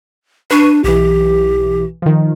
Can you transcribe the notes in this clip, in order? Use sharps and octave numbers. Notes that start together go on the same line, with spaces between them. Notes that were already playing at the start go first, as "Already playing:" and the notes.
D4 B4 C#6 D#7
B1 E3 G4
D#3 F3